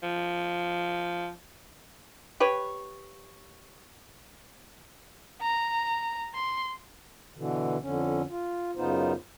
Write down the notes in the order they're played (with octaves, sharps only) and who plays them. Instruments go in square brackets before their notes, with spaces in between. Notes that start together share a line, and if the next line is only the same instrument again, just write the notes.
[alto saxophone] F3
[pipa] G4 B4 C#5
[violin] A#5
C6
[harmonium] B2 D3 E3
F2 D3 C#4
F4
F#2 C#3 B3 D#4 F4 C5